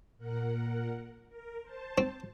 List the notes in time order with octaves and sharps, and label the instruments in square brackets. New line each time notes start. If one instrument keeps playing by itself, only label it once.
[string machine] A#2 A#4 F#5
A#4
C5 A5
[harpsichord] C4